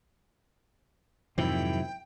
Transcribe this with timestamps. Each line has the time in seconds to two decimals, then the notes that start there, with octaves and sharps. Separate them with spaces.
1.38 F2 G#2 C3 D#3 F#3 C4 E4 G5